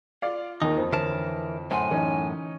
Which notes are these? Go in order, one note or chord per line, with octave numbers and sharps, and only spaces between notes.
F4 D5 F5
D#2 D#3 A#3 D#4
F2 C5
D3 E3 A#4 C#5 A5
F#2 A2 C5 F#5 G#5 C6
E3 C#4 D#4